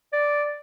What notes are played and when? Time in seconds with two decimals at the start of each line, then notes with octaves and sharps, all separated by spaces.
0.13 D5